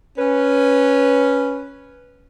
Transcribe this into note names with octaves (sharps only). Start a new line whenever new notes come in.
C#4 B4